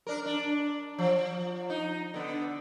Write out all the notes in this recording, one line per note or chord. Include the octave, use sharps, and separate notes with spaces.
D4 A#4
D4
F3
D#4
D3 B3